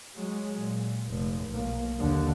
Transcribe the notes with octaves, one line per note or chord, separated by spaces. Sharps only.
F#3 G#3
A#2
F1
B1 A#3
D#2 D3